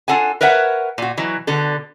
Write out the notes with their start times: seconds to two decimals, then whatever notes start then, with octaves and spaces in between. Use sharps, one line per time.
0.08 D4 F4 A4 F#5 G#5
0.41 A#4 B4 C#5 E5 F#5
0.98 A#2 F#4
1.17 B2 E3 F#3
1.47 B2 D3 A4